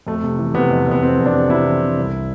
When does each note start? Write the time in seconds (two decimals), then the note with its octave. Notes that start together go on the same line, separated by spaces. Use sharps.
0.07 F2 A3
0.23 C3
0.39 E3
0.54 C3 B3
0.71 F2
0.87 F2 B3
1.02 F2 C4
1.19 F2
1.26 D4
1.33 C3
1.49 C3 E4
1.65 E3
1.81 C3
1.98 C2